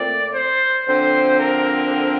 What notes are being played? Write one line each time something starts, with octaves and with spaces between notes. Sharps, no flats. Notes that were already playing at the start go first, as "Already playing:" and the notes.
Already playing: A#2 A3 C4 D5
C5
D3 F3 C4 C5
A#4